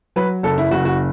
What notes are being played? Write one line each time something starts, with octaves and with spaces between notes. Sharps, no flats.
F#3 B4
F#1 A4
E4
F#1 F#4
F#4